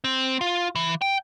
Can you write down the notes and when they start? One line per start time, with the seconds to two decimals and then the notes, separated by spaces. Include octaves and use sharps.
0.04 C4
0.41 F4
0.75 E3
1.02 G5